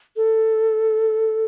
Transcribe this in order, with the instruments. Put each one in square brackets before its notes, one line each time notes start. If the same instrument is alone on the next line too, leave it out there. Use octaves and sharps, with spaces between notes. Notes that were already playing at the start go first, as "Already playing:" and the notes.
[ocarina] A4